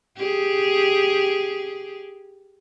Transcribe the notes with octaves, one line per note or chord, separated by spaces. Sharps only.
G4 G#4